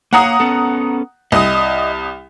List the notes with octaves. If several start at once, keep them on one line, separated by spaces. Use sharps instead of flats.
A#3 C#5 F5 F#5 A#5 D#6
B3 C#4 A4
C2 D#5 D#6